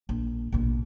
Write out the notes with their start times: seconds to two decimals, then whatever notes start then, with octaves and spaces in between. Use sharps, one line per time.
0.09 A#1
0.52 A#1 B2